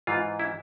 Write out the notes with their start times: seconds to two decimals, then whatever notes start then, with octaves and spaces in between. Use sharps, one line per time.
0.07 G#2 E3 F4
0.39 E4